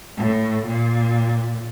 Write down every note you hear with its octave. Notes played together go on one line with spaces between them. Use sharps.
A2
A#2